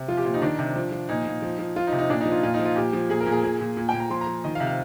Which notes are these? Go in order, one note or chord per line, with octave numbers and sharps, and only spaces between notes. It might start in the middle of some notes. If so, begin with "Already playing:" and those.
Already playing: C3
F3 F4
G4
A#2 F4
D#4
D#3 D4
C3
F3
F3
A#2 D#4
A#2
F3
F3
F3 F4
D#4
C3
D#4
A#2 D4
D#4
F3
F4
A#2 F4
D#4
F3
F4
A#2 G4
F3
A#2 G#4
A#4
A#2
G#4
A#2 G#4
A#2
A#2
G5
A#2
A#5
F3 C6
A#5
F3
D#3 D#5
F5
C3
F5